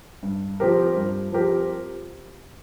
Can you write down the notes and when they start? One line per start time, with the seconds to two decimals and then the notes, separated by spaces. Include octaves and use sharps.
0.23 G2
0.60 F3 C4 G4 A#4
0.96 G2
1.32 F3 C4 G4 A#4